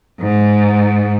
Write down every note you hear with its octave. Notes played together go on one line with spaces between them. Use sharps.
G#2